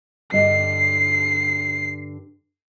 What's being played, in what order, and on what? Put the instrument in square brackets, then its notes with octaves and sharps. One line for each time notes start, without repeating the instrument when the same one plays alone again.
[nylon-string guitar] G2 D3 D#5 [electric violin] C7